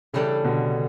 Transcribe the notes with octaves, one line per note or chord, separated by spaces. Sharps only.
A2 C#3 E3 G3 D4 A4
B2 D3